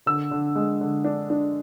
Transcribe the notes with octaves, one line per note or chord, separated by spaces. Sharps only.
D3 E6
D3
G#3
D3
D4
D4